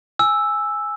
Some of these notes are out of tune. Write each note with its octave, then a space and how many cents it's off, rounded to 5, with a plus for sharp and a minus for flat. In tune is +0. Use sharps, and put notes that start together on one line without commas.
G#5 +0 E6 +0